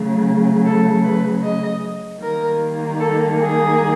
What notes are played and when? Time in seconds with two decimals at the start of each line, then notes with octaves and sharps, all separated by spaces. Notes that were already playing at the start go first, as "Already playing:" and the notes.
Already playing: C#3 F#3 A3
0.65 A4
1.03 B4
1.42 D#5
2.21 D#3 G3 A#3 A#4
2.99 A4
3.39 G#4